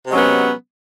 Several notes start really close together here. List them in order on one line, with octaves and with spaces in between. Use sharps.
C3 G#3 F#3 C#4 B3